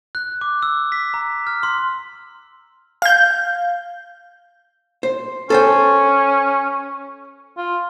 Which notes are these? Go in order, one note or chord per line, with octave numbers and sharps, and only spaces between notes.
F#6
D6
E6
B6
A#5
F6
C6
F5 G6
C5
C#4 A4 C5 G5
F4